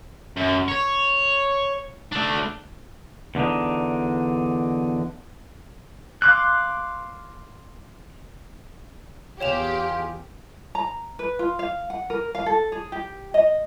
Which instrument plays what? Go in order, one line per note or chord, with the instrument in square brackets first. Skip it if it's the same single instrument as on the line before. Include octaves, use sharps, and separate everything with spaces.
[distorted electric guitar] F#2
C#5
A3 D4
[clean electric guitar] E2 D3 D4 D#4
[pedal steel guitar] F5 C6 D6 F6 F#6
[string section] E2 G4 G#4 [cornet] F4 [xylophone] C#5 E7 F7
[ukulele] A#5
B4
F4
F5
F#5
A#4
F5
A4
G#4
G4
D#5